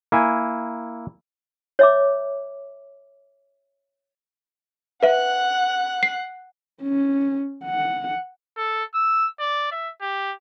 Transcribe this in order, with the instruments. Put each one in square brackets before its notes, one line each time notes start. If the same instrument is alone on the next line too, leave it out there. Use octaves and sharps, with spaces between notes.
[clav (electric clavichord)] A#3 E4 G#5
[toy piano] C#5 E5 D6
[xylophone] B4 E5 [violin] F#5 F#6
[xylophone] C7
[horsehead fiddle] C#4
F#5
[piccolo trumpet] A4
E6
D5
E5
G4